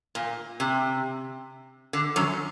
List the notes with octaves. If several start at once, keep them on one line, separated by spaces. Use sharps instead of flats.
A#2
C3
D3
F#2 F#3